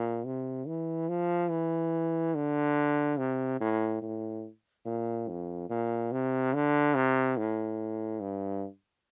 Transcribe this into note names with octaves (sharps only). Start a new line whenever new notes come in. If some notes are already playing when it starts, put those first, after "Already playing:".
Already playing: A#2
C3
E3
F3
E3
D3
C3
A2
A2
A#2
F2
A#2
C3
D3
C3
A2
G2